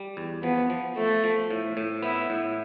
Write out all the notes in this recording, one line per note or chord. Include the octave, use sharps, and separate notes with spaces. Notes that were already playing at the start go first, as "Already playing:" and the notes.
Already playing: G3
E2
F3 B3
F3
F3 A3
F3
A2
A2
B3 E4
A2